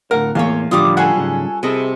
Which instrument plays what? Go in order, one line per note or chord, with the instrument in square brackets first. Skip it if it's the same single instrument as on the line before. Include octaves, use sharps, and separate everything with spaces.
[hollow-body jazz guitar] D2 A2 F5 [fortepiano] A#4 [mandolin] F#5
[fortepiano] E2 F5 [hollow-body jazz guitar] A2 A#3 [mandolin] C5 C#5
[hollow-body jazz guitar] A2 D3 F3 [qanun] G3 F4 [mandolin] D6 D#6
[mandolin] C#4 G#4 A4 [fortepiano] F#5 G#5
[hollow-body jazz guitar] G#2 C#3 F#3
[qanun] C3 D#5 [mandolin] E4 [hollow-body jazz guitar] G#4 A4